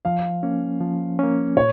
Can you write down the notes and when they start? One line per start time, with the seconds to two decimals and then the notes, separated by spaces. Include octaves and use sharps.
0.05 F3 F5
0.43 A#3 C#4
0.80 F3
1.19 A#3 C#4
1.56 A#2 C#5